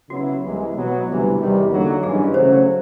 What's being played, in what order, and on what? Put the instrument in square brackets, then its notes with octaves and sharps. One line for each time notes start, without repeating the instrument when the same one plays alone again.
[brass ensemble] C#3 F#3 B3 E4 [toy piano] F#4
[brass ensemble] C2 C3 E3 G#3
B2 F#3 B3
D2 C3 E3 G3
E2 C3 D#3 G3
D3 F#3 A#3 D#4 F#4
[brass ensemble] G2 E3 G#3 C#4 [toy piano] G#4
[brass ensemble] C#3 F#3 A3 [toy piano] C5